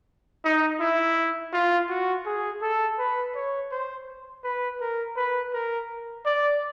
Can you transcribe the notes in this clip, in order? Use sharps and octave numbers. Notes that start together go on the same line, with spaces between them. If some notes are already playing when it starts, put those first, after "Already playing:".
D#4
E4
F4
F#4
G#4
A4
B4
C#5
C5
B4
A#4
B4
A#4
D5